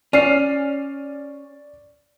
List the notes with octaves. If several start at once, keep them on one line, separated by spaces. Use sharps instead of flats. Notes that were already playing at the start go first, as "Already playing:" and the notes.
C#4 D5 F6 C7